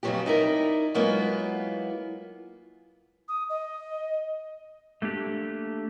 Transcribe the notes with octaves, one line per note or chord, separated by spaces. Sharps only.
F2 C#3 E3 F#3 B3 G4
D#4 E4 A#4 D5
F#3 G#3 A#3 B3 E4 F4
D#6
D#5
A3 A#3 D4 G4